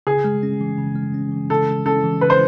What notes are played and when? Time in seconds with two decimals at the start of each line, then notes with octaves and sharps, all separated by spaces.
0.07 C#3 G#4
0.24 G#3
0.43 C#4
0.61 E3
0.78 C#3
0.96 G#3
1.14 C#4
1.32 E3
1.50 C#3 A4
1.68 G#3
1.86 C#4 A4
2.04 E3
2.21 C#3 B4
2.30 C5